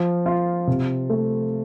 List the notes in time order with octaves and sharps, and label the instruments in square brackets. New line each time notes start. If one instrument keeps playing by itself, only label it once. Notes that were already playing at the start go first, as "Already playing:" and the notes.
Already playing: [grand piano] F3
F4
C3
A3